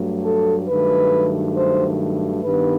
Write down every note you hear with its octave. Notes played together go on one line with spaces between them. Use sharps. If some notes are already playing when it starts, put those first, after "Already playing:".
Already playing: G2 F#3 A3
A4
G2 D#3 F#3 A3 B4
C5
G2 D#3 G3 B3 B4